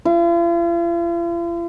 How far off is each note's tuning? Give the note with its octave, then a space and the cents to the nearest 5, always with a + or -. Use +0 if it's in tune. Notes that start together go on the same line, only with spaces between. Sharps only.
F4 -45